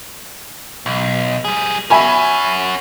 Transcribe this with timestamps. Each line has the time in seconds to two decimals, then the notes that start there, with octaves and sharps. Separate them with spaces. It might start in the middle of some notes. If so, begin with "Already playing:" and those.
0.86 B1
1.45 G3 G#4
1.90 C#4 F#4 E5 G#5 B5